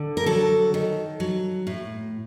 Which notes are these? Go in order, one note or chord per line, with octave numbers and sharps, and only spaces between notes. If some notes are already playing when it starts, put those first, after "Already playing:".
Already playing: D3
A#4
F#3 A4
D#3
F#3
A2